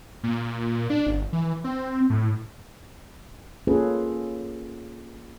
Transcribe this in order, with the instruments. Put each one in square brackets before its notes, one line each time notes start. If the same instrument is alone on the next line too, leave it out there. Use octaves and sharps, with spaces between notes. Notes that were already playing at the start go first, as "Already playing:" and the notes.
[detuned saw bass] A#2
D4
G1
E3
C4
A2
[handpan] A#3 C#4 F4 G#4 A4 B4